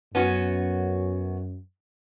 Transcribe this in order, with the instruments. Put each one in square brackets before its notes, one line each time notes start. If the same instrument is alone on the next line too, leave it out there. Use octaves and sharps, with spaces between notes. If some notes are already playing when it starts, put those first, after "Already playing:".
[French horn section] F#2 [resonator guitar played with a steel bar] B3 C#4 F#4